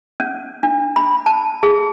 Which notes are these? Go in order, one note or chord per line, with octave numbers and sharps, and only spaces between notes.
C#4
D4
B5
A5
G#4